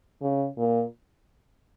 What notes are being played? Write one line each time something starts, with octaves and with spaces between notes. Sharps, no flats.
C#3
A#2